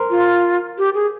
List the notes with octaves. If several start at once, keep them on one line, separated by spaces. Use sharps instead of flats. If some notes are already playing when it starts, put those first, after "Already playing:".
Already playing: A#4 C5
F4
G4
G#4